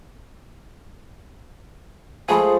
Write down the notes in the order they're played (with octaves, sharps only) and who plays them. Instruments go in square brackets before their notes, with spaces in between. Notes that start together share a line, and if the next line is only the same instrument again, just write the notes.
[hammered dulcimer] F3 G#3 A3 [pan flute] G#4 [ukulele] G#5 B5